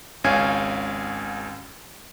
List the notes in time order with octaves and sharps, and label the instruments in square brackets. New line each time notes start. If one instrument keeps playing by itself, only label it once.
[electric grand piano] G#1 C#2 C#4 F5 G#5 G#6